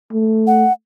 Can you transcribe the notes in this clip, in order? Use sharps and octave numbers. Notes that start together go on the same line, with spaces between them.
A3
F#5